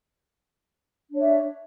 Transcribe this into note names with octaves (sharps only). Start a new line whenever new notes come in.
D4 C#5 E5